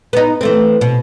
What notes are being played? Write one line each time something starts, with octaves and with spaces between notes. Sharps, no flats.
B3 D#4
E3 A3 C4
B2